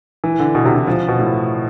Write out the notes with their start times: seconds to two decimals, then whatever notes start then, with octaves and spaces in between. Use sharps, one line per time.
0.24 E3
0.40 D3
0.55 B2
0.65 C3
0.76 E3
0.87 F3
1.08 B2
1.19 A2